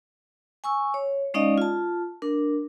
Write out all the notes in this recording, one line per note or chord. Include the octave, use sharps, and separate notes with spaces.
G#5 C#6 E6
C#5
G#3 C#4 D#4 D5 D#5 F5
F4 A5
D4 A#4